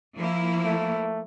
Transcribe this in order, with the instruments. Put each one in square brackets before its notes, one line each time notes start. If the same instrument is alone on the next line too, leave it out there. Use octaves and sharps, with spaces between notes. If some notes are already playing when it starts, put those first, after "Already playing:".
[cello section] F3 A#3 E4
[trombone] A3